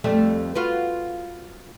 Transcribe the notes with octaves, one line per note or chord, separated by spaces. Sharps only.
F2 G3 A3
F4 F#4 B4